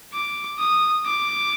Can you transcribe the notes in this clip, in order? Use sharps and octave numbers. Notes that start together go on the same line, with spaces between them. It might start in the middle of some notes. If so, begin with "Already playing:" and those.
D6
D#6
D6